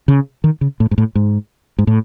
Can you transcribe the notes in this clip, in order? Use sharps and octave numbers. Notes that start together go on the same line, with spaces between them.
C#3
D#3
C#3
A2
G#2
A2
G#2
G#2
A2